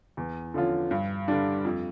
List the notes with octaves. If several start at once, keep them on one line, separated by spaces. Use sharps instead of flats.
E2
D3 F3 C#4 F4
G2
D3 G3 D4
F2